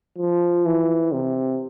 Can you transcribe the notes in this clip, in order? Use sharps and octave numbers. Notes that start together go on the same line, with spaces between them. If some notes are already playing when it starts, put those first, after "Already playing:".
F3
E3
C3